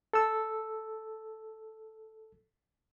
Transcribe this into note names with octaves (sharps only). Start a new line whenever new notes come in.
A4 E6